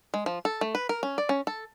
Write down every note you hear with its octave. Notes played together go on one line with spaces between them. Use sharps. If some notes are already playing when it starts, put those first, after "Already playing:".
G#3
F3
A4
A3
B4
A#4
C#4
D5
C#4
A4